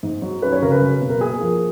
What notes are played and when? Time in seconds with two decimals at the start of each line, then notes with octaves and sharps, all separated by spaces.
0.03 G#2
0.22 F#3
0.42 C#4 B4
0.52 C#5
0.62 C#3 A#4
0.72 B4
0.82 F#3
1.01 B2
1.10 A#4
1.21 A#3 G#4
1.41 F3